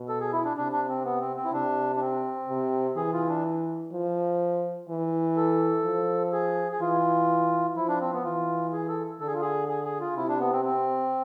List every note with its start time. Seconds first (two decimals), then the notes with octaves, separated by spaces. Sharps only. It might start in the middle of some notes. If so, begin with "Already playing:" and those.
Already playing: B2
0.08 A4
0.21 G#4
0.33 E4
0.45 D4
0.57 C3 D4
0.72 D4
0.89 C4
1.05 B3
1.21 C4
1.37 C4
1.45 E4
1.53 C3 D4
1.96 D4
2.01 C4
2.48 C3
2.96 E3 G#4
3.13 F4
3.29 D4
3.93 F3
4.89 E3
5.37 A4
5.85 F3
6.33 G#4
6.72 G#4
6.80 E3 F4
7.76 F3 E4
7.88 D4
8.00 C4
8.13 B3
8.24 E3 F4
8.73 G#4
8.89 A4
9.20 D3 A4
9.27 G#4
9.34 F4
9.42 G#4
9.68 G#4
9.84 G#4
10.00 F4
10.16 C3 E4
10.29 D4
10.40 B3
10.53 C4
10.65 C4